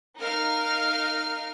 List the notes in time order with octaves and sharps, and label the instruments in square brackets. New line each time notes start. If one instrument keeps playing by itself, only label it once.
[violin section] D#4 A#4 F5 F6